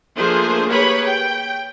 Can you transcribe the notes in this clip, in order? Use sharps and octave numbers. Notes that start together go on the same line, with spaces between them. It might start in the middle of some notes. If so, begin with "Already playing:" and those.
F3 A3 A#3 D4 G#4 C5
A#3 G4 G#4 B4 C#5 B5
G5